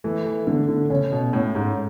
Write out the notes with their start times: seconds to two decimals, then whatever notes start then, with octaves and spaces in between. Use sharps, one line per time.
0.04 E3 A3
0.26 E3
0.47 D3 A3
0.69 D3
0.90 C#3 C#4
1.12 B2
1.33 A2 C#4
1.55 G#2